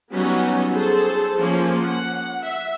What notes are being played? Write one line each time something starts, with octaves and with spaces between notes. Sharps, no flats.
F#3 G3 B3 C#4 D#4 F#4
G#4 A4 C5 A5
F3 A#3 C#4
F#5
E5